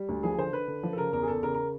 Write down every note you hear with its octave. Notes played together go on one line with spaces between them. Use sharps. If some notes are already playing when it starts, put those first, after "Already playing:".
Already playing: G3
D2
F3 G#4
D3 C5
D3 B4
D3
F3
A4
C#3 A#4
E2 A#4
G#4
E2 A4
C#3 A#4
A#4